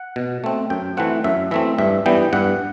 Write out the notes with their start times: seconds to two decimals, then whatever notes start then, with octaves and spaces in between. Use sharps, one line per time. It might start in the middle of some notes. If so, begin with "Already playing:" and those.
Already playing: F#5
0.16 B2
0.44 A3 C4
0.70 F#2 G5
0.97 E3 A3 C4 F#5
1.24 F#2 E5
1.51 E3 A3 C4 E5
1.78 G2 E5
2.06 E3 G3 B3 G5
2.33 G2 F#5